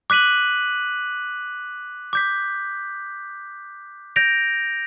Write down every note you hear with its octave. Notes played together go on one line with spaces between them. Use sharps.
D6 F#6 B6 D#7 F#7
D6 G6 B6
G6 A#6 D7 F7